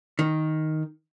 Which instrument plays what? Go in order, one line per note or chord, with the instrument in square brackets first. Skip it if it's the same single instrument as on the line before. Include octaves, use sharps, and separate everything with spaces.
[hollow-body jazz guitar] D#3